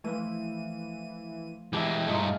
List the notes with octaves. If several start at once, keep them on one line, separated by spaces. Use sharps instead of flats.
E3 F3 A3 D#7
E3 G#3 G4 E5 A5 B5
G2 G#3 A3 D#4 F4